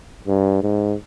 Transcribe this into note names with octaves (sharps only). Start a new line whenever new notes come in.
G2
G#2